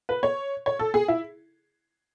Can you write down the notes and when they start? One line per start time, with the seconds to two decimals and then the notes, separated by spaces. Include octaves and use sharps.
0.09 B4
0.23 C#5
0.66 C#5
0.79 A4
0.94 G#4
1.08 E4